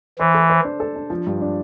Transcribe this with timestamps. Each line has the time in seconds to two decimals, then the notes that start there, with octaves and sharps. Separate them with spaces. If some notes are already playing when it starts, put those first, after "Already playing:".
0.19 E3 C5
0.35 A4
0.50 C5
0.64 D4
0.80 A4
0.96 D4
1.10 F3
1.26 G2
1.42 D4